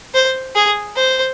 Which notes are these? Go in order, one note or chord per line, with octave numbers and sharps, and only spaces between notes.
C5
G#4
C5